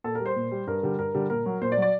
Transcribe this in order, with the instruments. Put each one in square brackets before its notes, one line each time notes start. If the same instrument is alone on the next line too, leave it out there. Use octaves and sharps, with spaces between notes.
[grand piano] A#2 A4
A#4
G3
C5
A#2
G3
G2 A#4
D3 G3
G2 A#4
D3 G3
A#2 A#4
F#3
A#2 C5
D5
F#3
D5